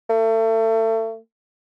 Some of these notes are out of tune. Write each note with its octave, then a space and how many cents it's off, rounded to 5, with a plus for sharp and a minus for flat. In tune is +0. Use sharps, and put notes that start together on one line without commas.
A3 +30